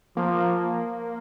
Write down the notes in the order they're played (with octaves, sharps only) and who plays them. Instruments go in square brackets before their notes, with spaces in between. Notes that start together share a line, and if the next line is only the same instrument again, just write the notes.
[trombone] F3 [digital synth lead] A#3